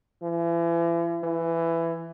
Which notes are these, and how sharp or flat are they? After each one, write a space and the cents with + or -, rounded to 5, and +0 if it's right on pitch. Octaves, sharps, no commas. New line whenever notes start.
E3 +40
E3 +15